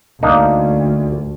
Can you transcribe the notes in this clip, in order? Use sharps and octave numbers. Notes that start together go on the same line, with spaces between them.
D2 A#3 D4 D#4